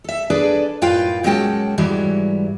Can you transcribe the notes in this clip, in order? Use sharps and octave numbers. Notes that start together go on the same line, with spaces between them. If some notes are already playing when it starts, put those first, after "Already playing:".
A4 E5
D4 G#4 A4 B4 D5
F#2 A2 F4 B4 F5 G5
A#2 F#3 G#3 C#4 G5 A5
G#2 E3 F#3 G3